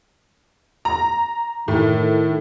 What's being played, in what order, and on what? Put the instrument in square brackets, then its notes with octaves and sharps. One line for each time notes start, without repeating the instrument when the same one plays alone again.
[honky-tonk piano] A#5
[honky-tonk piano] A2 [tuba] D#3